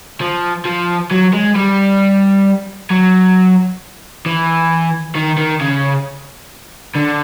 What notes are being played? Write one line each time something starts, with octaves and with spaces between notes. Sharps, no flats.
F3
F3
F#3
G#3
G3
F#3
E3
D#3
D#3
C#3
D3